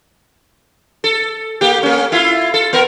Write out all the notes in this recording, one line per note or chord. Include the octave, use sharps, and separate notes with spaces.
A4
A#3 G4
A#3 C#4
E4 F4
A4
B3 A#4